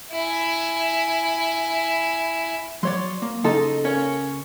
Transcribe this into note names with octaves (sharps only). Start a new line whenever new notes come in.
E4 G#5
F#3 C#5 D5 C6
A#3
C#3 D#4 A4 A#5 C6
A#3 C#4 C#5